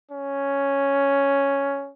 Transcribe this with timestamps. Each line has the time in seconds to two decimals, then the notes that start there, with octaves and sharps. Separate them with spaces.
0.11 C#4